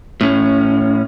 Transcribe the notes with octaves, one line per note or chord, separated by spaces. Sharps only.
A2 C#4